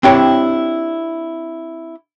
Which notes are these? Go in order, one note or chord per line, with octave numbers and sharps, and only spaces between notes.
C4 D4 E4 G4 C#5